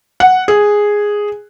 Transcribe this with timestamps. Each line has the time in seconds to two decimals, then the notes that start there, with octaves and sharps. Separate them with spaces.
0.20 F#5
0.48 G#4